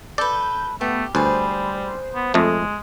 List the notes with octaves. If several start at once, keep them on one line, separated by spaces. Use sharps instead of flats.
A4 B4 D5 G6
A3 B3 G4
D2 G3 G#4 B4 C5
B3
F2 G#3 A3